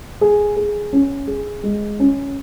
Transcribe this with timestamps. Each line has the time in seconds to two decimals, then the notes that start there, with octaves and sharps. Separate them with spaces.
0.21 G#4
0.57 G#4
0.93 C#4
1.27 G#4
1.63 G#3
2.00 C#4